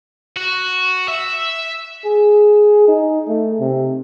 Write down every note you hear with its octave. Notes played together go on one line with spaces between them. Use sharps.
F#4
E5
G#4
D#4
A3
C3